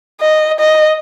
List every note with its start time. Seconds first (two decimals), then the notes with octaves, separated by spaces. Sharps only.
0.21 D#5
0.59 D#5